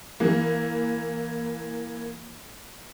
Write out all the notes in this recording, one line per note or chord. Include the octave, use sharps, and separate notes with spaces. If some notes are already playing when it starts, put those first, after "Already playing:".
E3 A#3